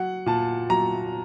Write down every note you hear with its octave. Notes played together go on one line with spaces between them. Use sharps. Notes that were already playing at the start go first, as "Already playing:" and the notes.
Already playing: F#3 F#5
A#2 A5
F#3 A#5